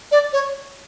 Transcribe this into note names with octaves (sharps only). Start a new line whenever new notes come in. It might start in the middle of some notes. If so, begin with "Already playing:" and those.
D5
C#5